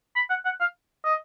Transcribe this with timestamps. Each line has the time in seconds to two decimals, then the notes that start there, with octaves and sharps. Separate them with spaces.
0.16 B5
0.30 F#5
0.45 F#5
0.61 F5
1.05 D#5